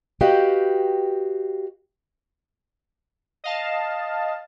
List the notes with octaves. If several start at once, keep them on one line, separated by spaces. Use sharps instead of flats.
F#4 G4 B4 D#5 F5 G5
D#5 F5 A5